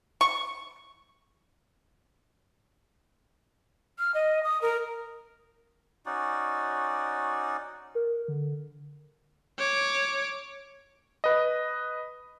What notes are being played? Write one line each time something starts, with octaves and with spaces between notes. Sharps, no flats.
C#6
F6
D#5
D#6
A#4
C#4 D#4 F#4 D5
A#4
D3
C#5 D6
B4 D#5